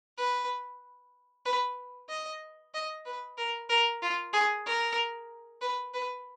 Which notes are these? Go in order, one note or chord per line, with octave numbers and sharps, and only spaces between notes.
B4
B4
D#5
D#5
B4
A#4
A#4
F4
G#4
A#4
B4
B4